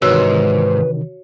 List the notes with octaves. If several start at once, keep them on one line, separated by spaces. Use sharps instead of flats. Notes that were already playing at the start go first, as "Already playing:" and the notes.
G#2 C3 D#3 E3 F#4 B4 C#5 E6